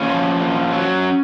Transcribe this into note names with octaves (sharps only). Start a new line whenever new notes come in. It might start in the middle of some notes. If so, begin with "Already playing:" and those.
Already playing: A#2 C#4
F3
A#2
F#3